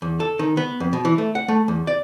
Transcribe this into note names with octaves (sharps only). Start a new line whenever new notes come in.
E2
A4
D#3
B3
F2
B2
E3
A3
F#5
A3
E2
D5